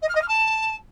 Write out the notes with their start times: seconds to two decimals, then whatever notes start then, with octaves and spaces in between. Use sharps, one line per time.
0.02 D#5
0.08 F6
0.15 D#5
0.21 F6
0.28 A5